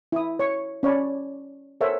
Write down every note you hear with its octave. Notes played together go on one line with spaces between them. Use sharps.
E4 D#6
C#5 C#6
C#4 C#5 D5 B5
A4 A#4 C5 C#5 E5 F#5